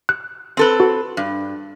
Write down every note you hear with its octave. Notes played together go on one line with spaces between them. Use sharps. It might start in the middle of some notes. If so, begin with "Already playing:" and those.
F#6
C4 A4 B4
F#4
G2